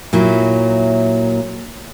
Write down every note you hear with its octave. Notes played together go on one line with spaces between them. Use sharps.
A#2 F#3 E4